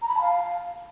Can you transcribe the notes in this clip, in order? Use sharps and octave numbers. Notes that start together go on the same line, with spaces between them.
A#5
B5
A5
F5